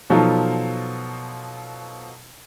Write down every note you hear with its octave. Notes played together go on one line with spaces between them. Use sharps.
B2 F3 F#3 D#4 F4 A4